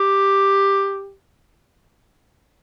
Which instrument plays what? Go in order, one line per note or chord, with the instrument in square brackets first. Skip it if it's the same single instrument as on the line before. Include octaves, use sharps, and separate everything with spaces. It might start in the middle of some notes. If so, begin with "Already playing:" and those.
Already playing: [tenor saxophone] G4